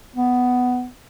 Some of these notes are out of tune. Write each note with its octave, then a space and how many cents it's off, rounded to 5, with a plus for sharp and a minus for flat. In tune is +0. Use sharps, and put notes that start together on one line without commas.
B3 +10